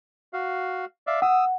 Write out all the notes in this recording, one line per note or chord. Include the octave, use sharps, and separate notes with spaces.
F#4 F5
D5 E5 F5
F#5 D#6 E6